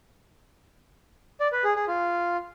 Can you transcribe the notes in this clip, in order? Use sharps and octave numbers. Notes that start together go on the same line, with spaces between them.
D5
B4
G#4
G#4
F4